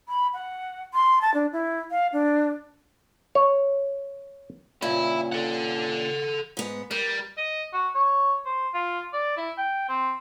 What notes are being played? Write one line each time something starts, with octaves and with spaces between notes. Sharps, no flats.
B5
F#5
C6
A5
D4
E4
F5
D4
C#5
G2 A#2 C#3 E4
A4 F#5
G#2 B3
G3 A#4
D#5
F#4
C#5
C5
F4
D5
E4
G5
C4